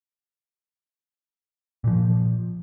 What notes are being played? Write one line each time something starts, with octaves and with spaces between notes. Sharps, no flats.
A#2 F3